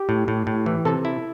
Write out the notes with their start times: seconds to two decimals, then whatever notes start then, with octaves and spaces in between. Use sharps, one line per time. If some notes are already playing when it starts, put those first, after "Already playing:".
Already playing: G4
0.09 A2
0.28 A2
0.47 A2
0.66 E3
0.85 C3 A4
1.05 E4